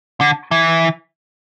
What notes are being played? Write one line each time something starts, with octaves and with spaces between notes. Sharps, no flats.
D3
E3